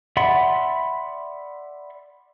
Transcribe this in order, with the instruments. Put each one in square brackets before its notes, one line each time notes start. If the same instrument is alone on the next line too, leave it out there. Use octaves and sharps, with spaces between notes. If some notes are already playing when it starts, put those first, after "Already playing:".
[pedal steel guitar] D5 E5 F#5 B5 C6